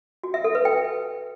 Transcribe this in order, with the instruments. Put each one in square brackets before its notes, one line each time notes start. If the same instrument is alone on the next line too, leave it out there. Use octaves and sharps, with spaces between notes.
[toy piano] F#4
E5
A4
B4
G5